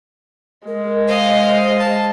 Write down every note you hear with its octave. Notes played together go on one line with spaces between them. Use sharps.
G#3 A#4
C5 D#5 F5
A5